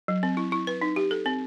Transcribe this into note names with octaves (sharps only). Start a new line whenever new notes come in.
F#3
C4
E4
E4
B4
D#4
G4
A4
C4